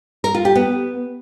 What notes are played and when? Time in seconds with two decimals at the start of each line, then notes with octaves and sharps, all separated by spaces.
0.24 A#4
0.34 F4
0.45 G4
0.55 B3